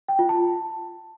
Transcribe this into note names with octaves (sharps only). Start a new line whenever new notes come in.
G5
F4
A5